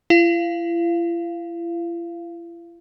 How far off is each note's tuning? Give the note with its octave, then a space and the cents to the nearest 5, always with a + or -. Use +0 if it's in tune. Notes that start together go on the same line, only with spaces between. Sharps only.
E4 +45 F5 -15